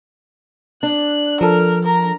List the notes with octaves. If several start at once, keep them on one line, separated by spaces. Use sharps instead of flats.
D4 F#6
F3 A4 A#4 F6
A#4 A#5